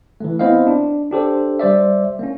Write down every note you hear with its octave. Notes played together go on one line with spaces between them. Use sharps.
E3 A3
B3 C4 E4 C5 D#5 F5
D4
D4 G4 A4 C5
G3 C5 D5 E5
A#3 C#4